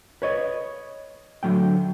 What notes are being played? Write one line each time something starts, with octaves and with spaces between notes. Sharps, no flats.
B4 C#5 D#5
D3 F#3 A3 G5